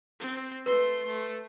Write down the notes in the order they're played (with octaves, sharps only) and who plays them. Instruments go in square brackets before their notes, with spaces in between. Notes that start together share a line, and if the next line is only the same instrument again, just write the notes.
[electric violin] C4
[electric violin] A3 C6 [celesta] B4
[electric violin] A3